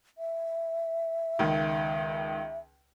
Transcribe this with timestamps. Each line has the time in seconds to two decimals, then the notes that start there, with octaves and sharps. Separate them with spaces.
0.18 E5
1.39 C#2 D#3